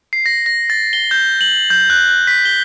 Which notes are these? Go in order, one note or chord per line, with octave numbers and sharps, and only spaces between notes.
C7
A#6
A#6
A6
G7
G6
F#7
G6
F#6
F#6
B6
G7